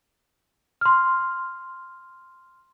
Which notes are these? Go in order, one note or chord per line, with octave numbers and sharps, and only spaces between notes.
C6 F6